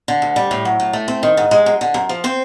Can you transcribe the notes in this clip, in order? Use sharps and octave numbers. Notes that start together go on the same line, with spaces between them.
D3
D2
G3
A2
F#3
A2
A3
C4
D#3
G#2
G#3
F#2
D3
F#2
F3
C4 C5